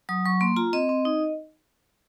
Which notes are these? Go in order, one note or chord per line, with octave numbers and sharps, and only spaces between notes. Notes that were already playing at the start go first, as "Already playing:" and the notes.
F#3 D#6
F#3 C#6
A#3 C6
F4 A#5
C4 D#5
C4
D#4